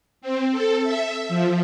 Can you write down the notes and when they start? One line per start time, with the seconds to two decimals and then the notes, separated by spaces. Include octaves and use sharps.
0.21 C4
0.52 A4
0.83 E5
1.29 F3